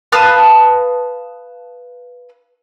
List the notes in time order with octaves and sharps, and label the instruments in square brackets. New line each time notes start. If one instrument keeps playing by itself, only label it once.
[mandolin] B4 F5 A5 D#6